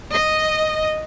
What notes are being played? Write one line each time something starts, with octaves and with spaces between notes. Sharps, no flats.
D#5